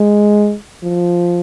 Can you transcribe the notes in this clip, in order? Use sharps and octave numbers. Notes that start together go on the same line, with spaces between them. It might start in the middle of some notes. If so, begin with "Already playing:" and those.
Already playing: G#3
F3